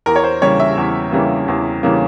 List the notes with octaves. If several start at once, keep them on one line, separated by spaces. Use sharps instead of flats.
E2 A#4
C#5
C5
C#3 E3 G3 A#3 C#5
E5
E2
C#3 E3 G3 A#3
E2
C#3 E3 G3 A#3